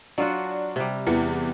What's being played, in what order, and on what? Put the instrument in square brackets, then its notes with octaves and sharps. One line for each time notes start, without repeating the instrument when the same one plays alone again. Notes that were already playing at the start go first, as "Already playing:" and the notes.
[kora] F#3 F4 F#4 [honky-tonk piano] D4
[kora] C3 G3
[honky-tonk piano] E2 E3 C#7